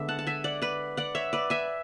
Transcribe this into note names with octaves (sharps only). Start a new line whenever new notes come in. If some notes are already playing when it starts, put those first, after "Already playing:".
Already playing: D3 G#3 B3 D5 E5
F#5 A5
A5
E5 G#5
D5 F#5
B4 D5
D5 F#5
C#5 E5
B4 D5
E5 G#5